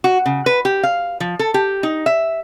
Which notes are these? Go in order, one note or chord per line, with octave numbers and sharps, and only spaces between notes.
F#4
C#3
B4
G4
F5
F3
A4
G4
D#4
E5